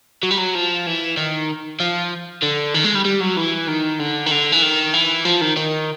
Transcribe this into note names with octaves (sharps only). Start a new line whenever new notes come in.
F#3
G3
F#3
F3
E3
D#3
F3
D3
D#3
G#3
G3
G3
F#3
E3
D#3
D3
D#3
D3
E3
D#3
E3
F3
D#3
D#3